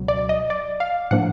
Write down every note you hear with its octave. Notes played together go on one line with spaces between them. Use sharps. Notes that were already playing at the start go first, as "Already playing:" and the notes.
Already playing: C#2 B2 F#3
D5
D#5
D5
F5
A2 F3 A#3 D4 F#5